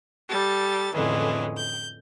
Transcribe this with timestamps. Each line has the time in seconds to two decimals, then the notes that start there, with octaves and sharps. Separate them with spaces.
0.29 G3 A4 A6
0.93 F2 A2 D3 E3 G#3 C#4
1.56 G6